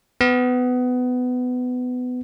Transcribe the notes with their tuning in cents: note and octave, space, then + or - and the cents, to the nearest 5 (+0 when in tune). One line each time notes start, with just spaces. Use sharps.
B3 +20